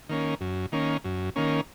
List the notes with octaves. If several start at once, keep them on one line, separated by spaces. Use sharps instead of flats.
D#3 A#3 C#4
F#2
D#3 A#3 C#4
F#2
D#3 A#3 C#4